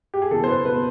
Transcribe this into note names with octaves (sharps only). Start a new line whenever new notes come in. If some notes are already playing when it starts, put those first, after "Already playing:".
G4
G#4
F#1 E2 B2 A4
C5
B4
B2 B4